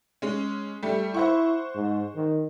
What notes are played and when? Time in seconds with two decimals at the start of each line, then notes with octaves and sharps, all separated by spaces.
0.22 G#3 C#4
0.83 G3 A3
1.14 E4 C5 F#5 C#6
1.75 G#2
2.16 D#3